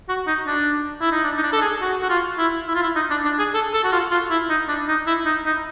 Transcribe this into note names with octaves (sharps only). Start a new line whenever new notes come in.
F#4
D#4
D4
E4
D#4
D4
D#4
D4
A4
G#4
F#4
F#4
F4
E4
E4
F4
E4
D#4
D4
D4
G#4
A4
A4
F#4
F4
F4
E4
D#4
D4
D#4
E4
D#4
D#4